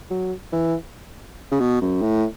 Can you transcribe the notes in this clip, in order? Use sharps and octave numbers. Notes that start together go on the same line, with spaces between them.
F#3
E3
C#3
B2
F#2
A2